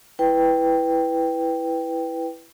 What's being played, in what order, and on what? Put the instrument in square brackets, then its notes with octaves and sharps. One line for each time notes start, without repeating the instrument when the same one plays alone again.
[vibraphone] E4 B4 G5